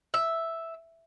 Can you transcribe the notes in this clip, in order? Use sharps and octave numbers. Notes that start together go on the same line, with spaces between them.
E5